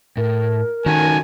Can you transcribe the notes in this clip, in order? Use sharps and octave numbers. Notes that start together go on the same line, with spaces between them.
A2 A#4
D#3 C#4 F#4 A4 G#5